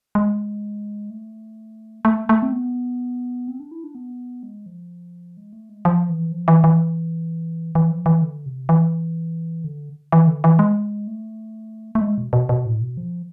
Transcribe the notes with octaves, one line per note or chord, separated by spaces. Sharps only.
G#3
A3
A3
A3
C4
B3
C4
D4
E4
D4
B3
G#3
F3
G#3
A3
G#3
F3
E3
F3
E3
E3
E3
F3
E3
D3
C3
E3
D3
E3
D3
E3
G#3
A3
A3
G#3
B2
B2
B2
A2
B2
F3